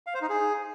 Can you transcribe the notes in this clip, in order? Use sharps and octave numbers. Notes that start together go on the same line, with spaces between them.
F5
C5
D#4
G#4